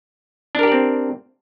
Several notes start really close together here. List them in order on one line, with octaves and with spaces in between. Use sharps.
D4 A#4 G4 D5 C4